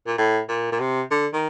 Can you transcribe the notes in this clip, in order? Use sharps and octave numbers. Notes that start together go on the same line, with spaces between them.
A#2
A2
A#2
A#2
C3
D3
D#3